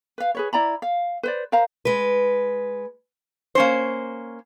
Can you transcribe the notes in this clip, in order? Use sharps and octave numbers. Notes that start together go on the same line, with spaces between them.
B4 F5
G#4 B4 C#5
E4 D5 A#5 B5
F5
B4 C5 D5
A#4 C5 F5 A#5
G#3 B4
A#3 C#4 C5